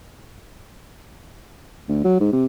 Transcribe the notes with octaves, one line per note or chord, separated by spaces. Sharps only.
D2
F#3
G#2
C3